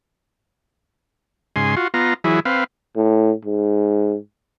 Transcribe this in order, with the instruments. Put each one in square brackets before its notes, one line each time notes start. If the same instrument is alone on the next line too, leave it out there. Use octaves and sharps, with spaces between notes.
[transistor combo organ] G#2 C#3 G#5 C6
F4 F#4
B3 F4 A#5
E3 F#3 E4 G#4
C4 B4 F5
[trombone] A2
G#2